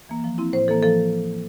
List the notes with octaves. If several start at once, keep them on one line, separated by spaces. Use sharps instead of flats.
E3 A#3
F3
C4 E4
A2 C5
E3 A#3 A4
F3 A4